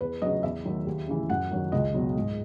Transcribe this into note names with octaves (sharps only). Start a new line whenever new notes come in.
E2 B4
C#3 F#3 D#5
E2 E5
D#3 F#3
D#2
C#3 E3
F#2 F#5
D#3 F#3
C#2 D#5
B2 F#3
G#2